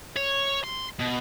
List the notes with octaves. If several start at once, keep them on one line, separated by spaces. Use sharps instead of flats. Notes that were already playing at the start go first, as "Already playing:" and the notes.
C#5
C6
B2